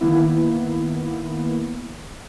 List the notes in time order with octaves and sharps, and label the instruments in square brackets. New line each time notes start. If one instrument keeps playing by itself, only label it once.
[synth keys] D#3 A#3 B3 E4